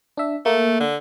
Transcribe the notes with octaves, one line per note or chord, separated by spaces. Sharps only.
D4 E5
A3 A#3
D3